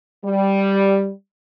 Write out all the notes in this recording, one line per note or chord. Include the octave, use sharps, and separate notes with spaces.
G3